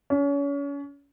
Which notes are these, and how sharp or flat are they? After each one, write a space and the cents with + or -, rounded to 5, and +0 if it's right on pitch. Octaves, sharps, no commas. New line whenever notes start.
C#4 +35